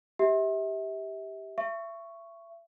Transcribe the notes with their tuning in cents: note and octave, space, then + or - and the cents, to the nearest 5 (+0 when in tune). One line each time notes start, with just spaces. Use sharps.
G4 +0 E5 -30
E5 +30 C#6 +0